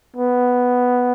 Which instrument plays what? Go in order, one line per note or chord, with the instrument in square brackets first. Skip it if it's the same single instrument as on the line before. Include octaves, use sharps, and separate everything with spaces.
[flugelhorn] B3